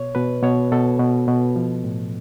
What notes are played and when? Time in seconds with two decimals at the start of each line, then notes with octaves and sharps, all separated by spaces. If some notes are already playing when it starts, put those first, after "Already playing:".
Already playing: B2 C#5
0.15 B2 B4
0.43 B2 C#5
0.72 B2 A4
1.00 B2
1.28 B2
1.56 F3
1.84 A2